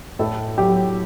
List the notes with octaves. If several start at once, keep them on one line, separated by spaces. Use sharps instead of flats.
A2 A4
F#3 G4